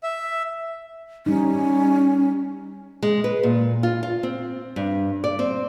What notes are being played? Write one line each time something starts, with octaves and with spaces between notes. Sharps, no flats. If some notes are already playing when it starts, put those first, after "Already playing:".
E5
G3 C#4 D#4
G#3
B4
A#2
F4
F4
C4
G2
D5
C4